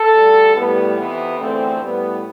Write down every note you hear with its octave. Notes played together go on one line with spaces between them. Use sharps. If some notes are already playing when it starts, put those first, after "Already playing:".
Already playing: A4
D2 D3 G3
A2 G3 B3
F2 C3 E3 B3
E2 D3 F3 A3 C4
A2 G3 B3